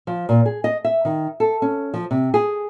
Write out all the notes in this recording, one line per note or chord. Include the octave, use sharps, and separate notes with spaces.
F3
A#2
G#4
D#5
E5
D#3
A4
C#4
F3
C3
G#4